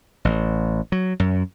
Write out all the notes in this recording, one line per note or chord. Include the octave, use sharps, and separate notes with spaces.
A1
F#3
F#2